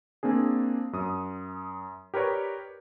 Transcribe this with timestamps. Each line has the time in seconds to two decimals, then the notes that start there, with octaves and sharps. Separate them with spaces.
0.23 A#3 C4 D4 G#4
0.93 F#2 D#6
2.14 G4 A#4 B4 C#5 D5